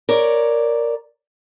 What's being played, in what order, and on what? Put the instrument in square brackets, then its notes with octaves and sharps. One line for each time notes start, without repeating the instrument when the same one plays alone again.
[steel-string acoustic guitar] A#4 C#5 D5